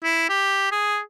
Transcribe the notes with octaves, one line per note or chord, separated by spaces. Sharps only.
E4
G4
G#4